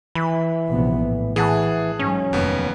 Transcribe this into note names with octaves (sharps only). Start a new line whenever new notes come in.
E3 B5
A#1 C3 B3
A2
E3 G#4 F#5 A5
G#2 F#3 C#4
F1 D#2 B3